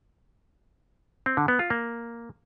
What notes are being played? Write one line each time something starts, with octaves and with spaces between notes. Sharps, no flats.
C4
D3
B3
F4
A#3